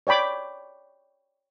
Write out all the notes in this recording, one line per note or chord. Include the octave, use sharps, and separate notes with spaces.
C#5 D5 G5 B5 D6